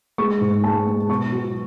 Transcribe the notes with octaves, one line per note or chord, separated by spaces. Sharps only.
G#3 C#6
G#2
G#3 A5
G#3
B2 C#6
F#3